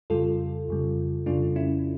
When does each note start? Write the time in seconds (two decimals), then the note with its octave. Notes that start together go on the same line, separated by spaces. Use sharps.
0.10 F2 C#3 G3 F4 A4
0.69 F2 C#3 G3
1.26 F2 C#3 G3 D4 F4
1.56 C#4 E4